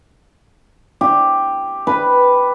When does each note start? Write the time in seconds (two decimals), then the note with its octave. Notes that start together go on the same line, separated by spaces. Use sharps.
1.01 G4
1.87 B4